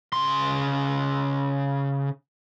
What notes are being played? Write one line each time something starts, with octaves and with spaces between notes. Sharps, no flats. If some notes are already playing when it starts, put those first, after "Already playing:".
C#3 C6